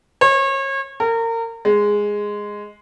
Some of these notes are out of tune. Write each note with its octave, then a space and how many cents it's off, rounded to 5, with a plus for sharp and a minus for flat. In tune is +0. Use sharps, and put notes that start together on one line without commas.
C#5 -35
A#4 -30
G#3 -5